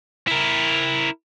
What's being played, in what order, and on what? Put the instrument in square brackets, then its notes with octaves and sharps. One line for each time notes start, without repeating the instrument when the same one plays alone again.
[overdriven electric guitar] E4 A#4